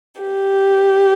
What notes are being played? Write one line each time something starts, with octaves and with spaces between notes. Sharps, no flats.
G4